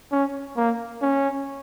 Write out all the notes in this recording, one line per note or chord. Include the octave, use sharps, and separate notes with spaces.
C#4
A#3
C#4